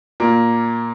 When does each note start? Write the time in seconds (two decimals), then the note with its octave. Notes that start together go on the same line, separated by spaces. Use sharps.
0.20 A#2 A#3